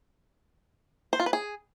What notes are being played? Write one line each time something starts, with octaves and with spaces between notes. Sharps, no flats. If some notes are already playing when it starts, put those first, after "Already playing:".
C5
F4
B4
G#4